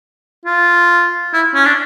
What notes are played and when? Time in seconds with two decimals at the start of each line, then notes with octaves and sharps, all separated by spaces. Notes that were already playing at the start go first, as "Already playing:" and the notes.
0.45 F4
1.33 E4
1.55 C#4
1.65 D4